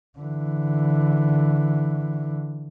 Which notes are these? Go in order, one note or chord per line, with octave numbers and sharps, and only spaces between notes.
D3 E3